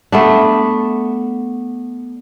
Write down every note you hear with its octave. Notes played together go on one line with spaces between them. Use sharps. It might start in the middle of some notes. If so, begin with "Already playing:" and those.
A3 B3 D4